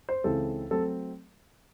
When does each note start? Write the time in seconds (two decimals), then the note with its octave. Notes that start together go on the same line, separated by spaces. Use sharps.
0.09 C5
0.24 C#2 C#3 E3 C4 A4
0.71 F#3 A3 C4 A4